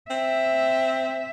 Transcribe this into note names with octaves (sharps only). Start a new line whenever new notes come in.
C4 E5